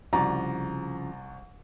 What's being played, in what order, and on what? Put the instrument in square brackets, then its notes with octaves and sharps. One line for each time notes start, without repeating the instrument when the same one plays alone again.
[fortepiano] C2 F#4 D5 [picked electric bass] C#3 F3 [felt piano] A#5